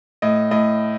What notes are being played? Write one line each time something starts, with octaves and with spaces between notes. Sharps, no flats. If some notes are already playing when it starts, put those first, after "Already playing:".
A2 D#5
A2 D#5